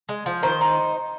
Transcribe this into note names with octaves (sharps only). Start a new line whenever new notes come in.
G#3
F3
D#3 C5
D#4